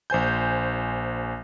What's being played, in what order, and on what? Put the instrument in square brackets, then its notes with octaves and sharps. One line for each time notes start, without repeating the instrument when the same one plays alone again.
[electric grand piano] A#1 C5 G#5 G6